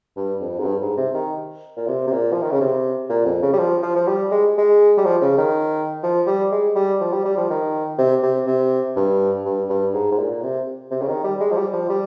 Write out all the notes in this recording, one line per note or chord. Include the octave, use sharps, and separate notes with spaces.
G2
F2
G#2
G2
G#2
C3
D#3
A#2
C3
C3
A#2
F3
D#3
C#3
C3
A#2
F2
C#3
G3
F3
F3
F3
G3
G#3
G#3
G3
F3
C#3
D#3
F3
G3
G#3
G3
F3
G3
G3
F3
D#3
C3
C3
C3
G2
G2
G2
G#2
G#2
A#2
A#2
C3
C3
C#3
D#3
G3
G#3
F3
G3
F3
G3